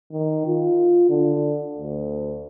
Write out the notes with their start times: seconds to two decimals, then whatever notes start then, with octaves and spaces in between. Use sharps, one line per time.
0.12 D#3
0.47 F4
1.09 D3
1.78 D2